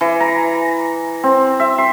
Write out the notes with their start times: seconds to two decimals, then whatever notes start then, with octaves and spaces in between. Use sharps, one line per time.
0.01 E3
0.21 A#5
1.23 C4
1.60 E5
1.78 C6